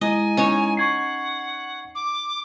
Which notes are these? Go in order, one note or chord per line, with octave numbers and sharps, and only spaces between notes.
G#3 E4 D#5 G#5 A#5
C#4 D#4 C#5
F#5 C#6 G#6 C7
D6